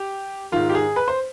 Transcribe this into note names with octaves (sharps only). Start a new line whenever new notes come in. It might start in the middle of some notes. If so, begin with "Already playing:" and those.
Already playing: G4
G#2 D#3 F4
G4
G#4
B4
C5